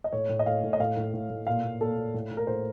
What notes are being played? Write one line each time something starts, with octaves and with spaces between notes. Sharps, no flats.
D#5
A2 C#5
A2
D#5
A2 F5
A2
D#5
A2 F5
A2
A2
A2
A#2 F5
A#2
A#2 A4
A#2
A2
A2
A#4
A2 C5